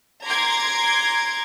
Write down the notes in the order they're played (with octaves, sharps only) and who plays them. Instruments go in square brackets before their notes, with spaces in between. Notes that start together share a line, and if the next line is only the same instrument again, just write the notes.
[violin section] A#5 C6 D6 G#6